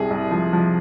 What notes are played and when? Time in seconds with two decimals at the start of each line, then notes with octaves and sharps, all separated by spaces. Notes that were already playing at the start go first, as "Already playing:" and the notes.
Already playing: C2 C3 G#4
0.10 C2
0.31 F3
0.53 F3